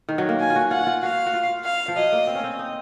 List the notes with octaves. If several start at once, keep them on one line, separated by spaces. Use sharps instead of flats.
D#3
F#3
A#3
G#5
F4
F#4
F4 F#5
F4
F#4 F5
F#4
F4
F5
F3
F#3 D#5
A#3
C4
C#4
C4
D#4